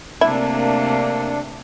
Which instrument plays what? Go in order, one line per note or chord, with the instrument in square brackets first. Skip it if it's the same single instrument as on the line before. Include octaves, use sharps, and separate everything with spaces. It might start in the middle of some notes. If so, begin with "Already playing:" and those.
[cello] C3 A3 [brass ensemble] A#3 [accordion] D4 [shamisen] E4